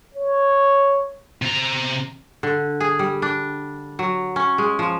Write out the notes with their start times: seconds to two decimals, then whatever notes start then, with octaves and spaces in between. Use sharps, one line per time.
0.14 C#5
1.42 C3 A#5
2.43 D3
2.80 G#4
2.99 G3
3.22 D4
3.99 F#3
4.36 C#4
4.58 G#3
4.79 F3